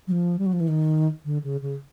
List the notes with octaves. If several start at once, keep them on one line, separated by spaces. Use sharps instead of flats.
F#3
F3
G3
F#3
F3
E3
D#3
D3
C#3
C#3